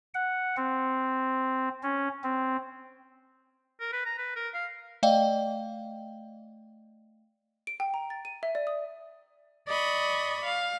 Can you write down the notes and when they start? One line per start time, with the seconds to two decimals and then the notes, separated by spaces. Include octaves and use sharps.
0.15 F#5
0.57 C4
1.83 C#4
2.24 C4
3.81 A#4
3.93 B4
4.06 A#5
4.18 B4
4.36 A#4
4.54 F5
5.03 A3 D5 D#5 F5 G5
7.67 D7
7.80 G5
7.94 A#5
8.10 A6
8.25 D#7
8.43 E5
8.55 D5
8.67 D#6
9.67 D5 D#5 B5 C#6
10.45 F5